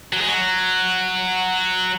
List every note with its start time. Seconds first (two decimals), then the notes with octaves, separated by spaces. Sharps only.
0.13 F#3
0.20 G#3
0.28 F#3